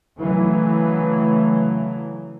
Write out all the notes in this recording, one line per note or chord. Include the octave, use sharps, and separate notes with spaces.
C#3 E3 F#3 A3